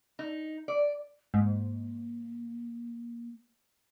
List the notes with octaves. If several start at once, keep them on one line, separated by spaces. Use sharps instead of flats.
D#4
D5
G#2 A#3